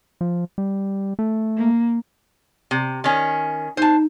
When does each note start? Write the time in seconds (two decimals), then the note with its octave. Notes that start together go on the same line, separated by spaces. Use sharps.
0.21 F3
0.58 G3
1.19 A3
1.57 A#3
2.71 C3
3.04 D#3 C#4
3.77 D#4 C5 A5